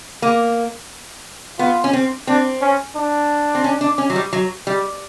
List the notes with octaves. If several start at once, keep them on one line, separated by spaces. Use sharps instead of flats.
A#3
B3 F4
C#4
C4
C4 D4
C#4
D4
C4
C#4
D4
C#4
F#3
G3
F#3
G3